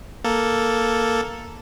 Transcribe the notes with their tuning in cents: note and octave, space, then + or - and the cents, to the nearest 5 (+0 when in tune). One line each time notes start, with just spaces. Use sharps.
A#3 +0 A4 +0